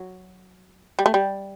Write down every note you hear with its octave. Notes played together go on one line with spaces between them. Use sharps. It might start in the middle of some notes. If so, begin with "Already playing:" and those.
Already playing: F#3
G3
A3
G3